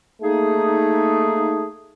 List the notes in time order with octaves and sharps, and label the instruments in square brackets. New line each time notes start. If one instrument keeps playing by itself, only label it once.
[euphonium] A3 [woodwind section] A#3 D#4 G#4